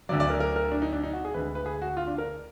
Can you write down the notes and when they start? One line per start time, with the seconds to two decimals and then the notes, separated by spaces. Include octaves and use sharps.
0.09 D2 D3 F#3 D5
0.20 D5
0.30 A#4
0.40 A#4
0.56 A#4
0.72 D4
0.82 D#4
0.93 D4
1.03 D#4
1.13 F#4
1.25 G#4
1.34 D2 D3 G#3 B4
1.55 B4
1.66 G#4
1.82 F#4
1.97 F4
2.07 D4
2.18 A#4